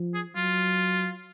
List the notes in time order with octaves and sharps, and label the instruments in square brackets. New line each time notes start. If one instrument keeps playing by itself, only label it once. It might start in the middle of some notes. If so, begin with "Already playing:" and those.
Already playing: [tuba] F3
[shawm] G#4
[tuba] F#3 [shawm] F4